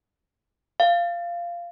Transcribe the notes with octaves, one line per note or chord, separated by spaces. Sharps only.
F5